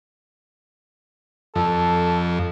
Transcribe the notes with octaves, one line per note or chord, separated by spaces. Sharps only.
F2 A4